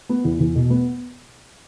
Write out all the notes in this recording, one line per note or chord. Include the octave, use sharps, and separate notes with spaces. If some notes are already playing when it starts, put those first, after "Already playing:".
B3
E2
E2
B2
B3